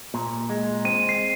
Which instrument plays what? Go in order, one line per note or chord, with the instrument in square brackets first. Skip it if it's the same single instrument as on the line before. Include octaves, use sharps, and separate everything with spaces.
[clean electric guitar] A#2
G#3
[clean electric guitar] C4 [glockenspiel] D#7
[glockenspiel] C7